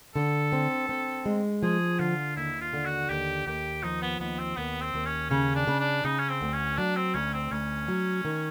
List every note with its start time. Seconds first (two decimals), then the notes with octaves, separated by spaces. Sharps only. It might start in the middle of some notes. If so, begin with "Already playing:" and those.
0.16 D3 A4
0.52 C4
0.89 C4
1.26 G#3
1.63 F3 G#4
1.99 D3 F4
2.36 D#2 E4
2.61 F4
2.73 D3
2.86 F#4
3.10 D#2 G4
3.47 D#2 G4
3.83 F3 D#4
4.02 B3
4.20 D#2 B3
4.39 C4
4.57 D#2 B3
4.82 C4
4.94 D#2
5.06 C#4
5.30 C#3 C#4
5.55 D4
5.67 C#3
5.80 D4
6.04 C#3 D#4
6.19 C#4
6.29 C4
6.41 D2
6.53 C#4
6.77 F#3 D4
6.96 C4
7.14 D2 C#4
7.34 C4
7.52 D2 C#4
7.88 F#3
8.25 D#3